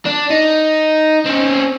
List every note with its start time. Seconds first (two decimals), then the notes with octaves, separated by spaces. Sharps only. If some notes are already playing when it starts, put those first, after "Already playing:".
0.06 D4
0.30 D#4
1.25 C4 C#4